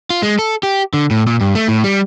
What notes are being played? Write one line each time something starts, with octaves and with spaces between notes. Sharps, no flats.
F4
G#3
A4
G4
D3
A2
A#2
G2
A3
A2
G3